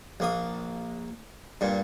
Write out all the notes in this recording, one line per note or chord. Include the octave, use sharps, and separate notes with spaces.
A#1 A#3 D#6
G2 A#2